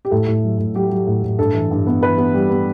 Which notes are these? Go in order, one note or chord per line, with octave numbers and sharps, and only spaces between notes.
G4
A2 A4
A2
F#3
A2
F#3 G4
F#3
A2
A2
G2 A4
E3
G2
B3
E3 B4
B3
G3
B3